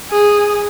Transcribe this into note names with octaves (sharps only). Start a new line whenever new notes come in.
G#4